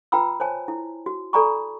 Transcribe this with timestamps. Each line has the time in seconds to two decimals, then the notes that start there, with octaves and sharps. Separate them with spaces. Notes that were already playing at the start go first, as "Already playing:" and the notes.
0.12 F4 B4 G5 A#5 B5 E6
0.40 C5 C#5 G#5 A5
0.68 E4
1.06 F#4
1.33 A4 D5 G#5 A#5 B5 C#6